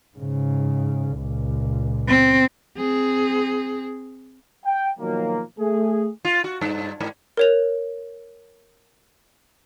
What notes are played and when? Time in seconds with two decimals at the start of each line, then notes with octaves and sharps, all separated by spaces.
0.17 G#2 C#3
1.16 C#2 A#2
2.08 C4
2.77 C4 G#4
4.64 G5
4.99 B2 D#3 F3 F#3 A#3
5.59 A3 G#4
6.25 F4
6.44 F#4
6.61 G2
7.01 G#2
7.37 A#4 C#5 F7